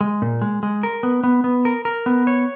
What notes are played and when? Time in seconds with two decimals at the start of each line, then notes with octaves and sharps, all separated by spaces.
0.01 G#3
0.22 A#2
0.42 G#3
0.63 G#3
0.83 A#4
1.03 B3
1.24 B3
1.44 B3
1.65 A#4
1.85 A#4
2.06 B3
2.27 C#5